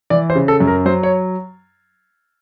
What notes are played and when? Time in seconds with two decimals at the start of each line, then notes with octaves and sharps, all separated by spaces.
0.10 E3 D5
0.30 C5
0.35 C#3
0.48 A4
0.60 F#2
0.67 A#4
0.86 F#3 C5
1.03 C#5